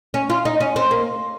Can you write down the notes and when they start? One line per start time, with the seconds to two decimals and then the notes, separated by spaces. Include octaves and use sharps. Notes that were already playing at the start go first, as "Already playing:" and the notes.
0.14 C#4
0.30 F4
0.45 D#4
0.60 C#4
0.76 C4
0.91 A#3